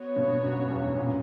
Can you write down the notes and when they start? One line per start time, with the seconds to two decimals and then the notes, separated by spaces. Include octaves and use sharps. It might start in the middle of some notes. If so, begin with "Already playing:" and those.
Already playing: B3 F#4 C#5
0.16 G2 B2
0.43 F#2
0.69 E2 G2
0.96 F#2 A#2